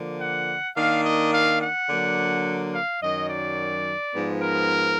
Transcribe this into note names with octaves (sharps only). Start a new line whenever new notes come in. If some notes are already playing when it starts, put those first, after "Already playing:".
Already playing: D3 F3 A#3
F#5
D#3 A#3 D4 F5
D#5
F5
F#5
D3 F#3 A#3 D4
F5
F#2 D#3 F#3 D#5
D5
G#2 F3 B3
A#4